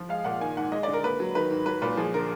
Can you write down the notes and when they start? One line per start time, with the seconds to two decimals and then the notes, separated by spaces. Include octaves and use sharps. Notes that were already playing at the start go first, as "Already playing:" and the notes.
Already playing: F3
0.09 G#3 F5
0.24 A#2 F#5
0.41 D#3 G#5
0.57 G#2 F#5
0.72 G#3 D#5
0.83 D3 D5
0.93 A#4
1.04 A#3 B4
1.20 F#3
1.35 D#3 B4
1.51 G#2
1.66 F#3 B4
1.82 A#2 B4
1.97 F3 G#4
2.14 D3 A#4